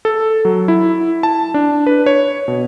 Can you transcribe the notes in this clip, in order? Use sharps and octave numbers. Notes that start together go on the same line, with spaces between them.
A4
F#3
E4
A5
D4
B4
C#5
B2